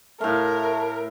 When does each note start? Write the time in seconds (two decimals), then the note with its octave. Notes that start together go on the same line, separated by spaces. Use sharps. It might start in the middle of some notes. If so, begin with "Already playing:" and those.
0.21 A2 A3 A#4 F5